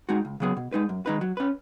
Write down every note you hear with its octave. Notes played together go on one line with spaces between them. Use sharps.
G#3 D#4 F#4
C#2
C#3 F#3 B3 G#4
B2
G#3 D#4 B4
F#2
D#3 G#3 D#4 B4
F#3
C#4 B4